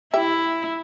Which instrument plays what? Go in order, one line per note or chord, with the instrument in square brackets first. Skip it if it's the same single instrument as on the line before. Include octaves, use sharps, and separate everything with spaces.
[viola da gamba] E4 [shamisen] G4 E5